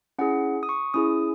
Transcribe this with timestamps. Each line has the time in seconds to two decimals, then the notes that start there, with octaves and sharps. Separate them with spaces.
0.18 C#4 E4 G#4 F#5
0.63 D#6
0.69 C#6
0.94 C#4 E4 G#4 D#6